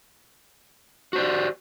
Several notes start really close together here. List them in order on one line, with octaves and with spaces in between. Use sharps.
F#4 C5 D5 G4